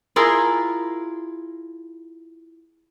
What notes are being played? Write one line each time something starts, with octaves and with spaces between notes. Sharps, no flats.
E4 F4 G#4 A#4